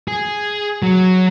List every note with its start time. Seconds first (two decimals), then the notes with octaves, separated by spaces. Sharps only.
0.08 G#4
0.82 F#3